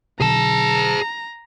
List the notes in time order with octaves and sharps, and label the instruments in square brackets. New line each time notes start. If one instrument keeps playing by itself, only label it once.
[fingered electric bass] B2 D3 F#3 [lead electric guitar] G#4 A5 [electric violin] A#5